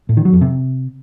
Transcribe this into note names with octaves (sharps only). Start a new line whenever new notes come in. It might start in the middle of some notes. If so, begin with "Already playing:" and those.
A2
D#3
F#3
F2
C3